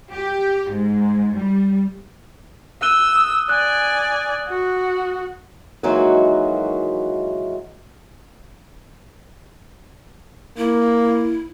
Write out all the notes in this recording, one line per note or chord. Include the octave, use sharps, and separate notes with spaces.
G4
G#2
G3
E6 F#6 D#7 G7
D#6
D5 G#5 F#6
F#4
D#3 E3 F#3 G#3 A#3 F#4
A#3 E4